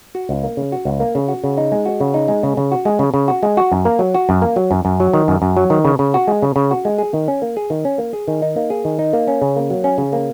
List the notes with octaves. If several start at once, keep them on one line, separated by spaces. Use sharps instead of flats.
F#4
C#2
A#3
C#3
F#4
C#2
A#3
C#3
F#4
C#3
D#4
G#3
F#4
C#3
D#4
G#3
C#3
C#3
F#4
G#3
C#3
C#3
F#4
G#3
F#4
F#2
A#3
F#3
F#4
F#2
A#3
F#3
F#2
F#2
F#3
D#3
F#2
F#2
F#3
D#3
C#3
C#3
F#4
G#3
C#3
C#3
F#4
G#3
G#4
D#3
C#4
A#3
G#4
D#3
C#4
A#3
G#4
D#3
D#4
A#3
G#4
D#3
D#4
A#3
C#4
C#3
A#3
F#3
C#4
C#3
A#3